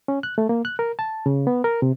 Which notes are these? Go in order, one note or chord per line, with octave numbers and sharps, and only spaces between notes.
C#4
F#6
A3
A#3
F#6
A#4
A5
C#3
B3
A#4
C3